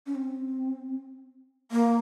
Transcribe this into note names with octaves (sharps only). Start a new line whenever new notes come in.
C#4
C4
A#3